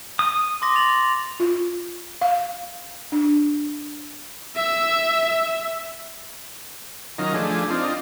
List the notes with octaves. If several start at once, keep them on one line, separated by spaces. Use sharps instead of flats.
D#6
C6 D6 A#6
A6 F7 F#7
F4
F5
D4
E5 E6
D#3 F#3 C#4 D#4 F4 A#4
F3 A3 D4 G#4
C4 D4 D#4 F4